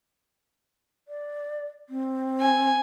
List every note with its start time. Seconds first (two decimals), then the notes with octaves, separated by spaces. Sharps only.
1.08 D5
1.89 C4
2.41 G#5